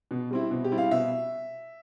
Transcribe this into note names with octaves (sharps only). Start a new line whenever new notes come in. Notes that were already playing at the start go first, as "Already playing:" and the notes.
B2
G3 C4 E4
B2
G4
G3 C4 E4
F5
B2 E5